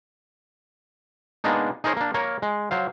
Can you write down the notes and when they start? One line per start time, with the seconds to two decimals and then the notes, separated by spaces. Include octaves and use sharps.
1.44 G#3 A#3 B3 D4 D#4
1.84 D#4 G#4 A#4 C5 C#5
1.97 A#3 D4
2.14 A#3 A#4 C#5
2.42 G#3
2.71 F#3 C5 F5